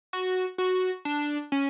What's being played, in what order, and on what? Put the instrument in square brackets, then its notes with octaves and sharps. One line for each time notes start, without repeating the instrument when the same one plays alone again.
[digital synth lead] F#4
F#4
D4
C#4